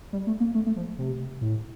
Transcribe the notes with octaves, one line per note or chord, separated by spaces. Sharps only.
G3
A3
A#3
A3
A3
F3
C3
A2